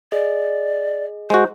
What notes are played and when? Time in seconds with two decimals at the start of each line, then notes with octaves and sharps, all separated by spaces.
0.12 G#4 D5 D#5
1.30 G#3 F#4 C5